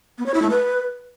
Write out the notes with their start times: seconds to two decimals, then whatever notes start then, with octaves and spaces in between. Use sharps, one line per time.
0.18 B3
0.26 C#5
0.34 E4
0.42 A3
0.50 B4